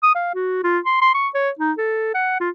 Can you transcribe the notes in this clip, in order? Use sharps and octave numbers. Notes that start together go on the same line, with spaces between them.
D#6
F5
F#4
F4
C6
C6
C#6
C#5
D#4
A4
F#5
F4